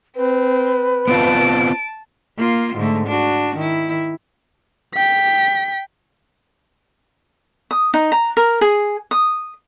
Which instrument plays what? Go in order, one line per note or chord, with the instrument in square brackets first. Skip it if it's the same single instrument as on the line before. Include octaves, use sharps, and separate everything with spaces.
[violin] C4 [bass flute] B4
[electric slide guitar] B3 C4 F4 [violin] A5 D7
[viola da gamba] A#3 F4
G#2 D3 A3
D4 F#4
D#3 E4
[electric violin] G5 B6
[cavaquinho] D#6
D#4
A#5
A#4
G#4
D#6